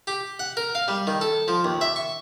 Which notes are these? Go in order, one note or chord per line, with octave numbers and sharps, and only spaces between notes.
G4
F#5
A#4
F5
G3
D#3
A4
F3
D#2
E5
C#6